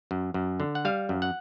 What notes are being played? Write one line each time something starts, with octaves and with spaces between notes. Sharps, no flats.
F#2
F#2
D3
F#5
G3 F5
F#2
F#5